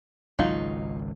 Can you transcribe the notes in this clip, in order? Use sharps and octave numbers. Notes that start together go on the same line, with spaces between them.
G#1 C#2 F#3 D#4 F4